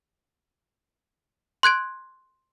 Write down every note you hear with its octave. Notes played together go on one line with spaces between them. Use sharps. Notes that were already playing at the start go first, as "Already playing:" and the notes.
C6 F#6 G#6 D7